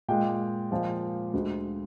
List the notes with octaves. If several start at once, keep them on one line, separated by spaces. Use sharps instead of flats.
A#2 G#3 G5
A#2 F3 G#3
D2 D3 G#3